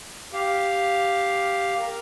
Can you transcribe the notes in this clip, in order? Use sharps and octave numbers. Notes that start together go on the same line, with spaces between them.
G4 F5
A#4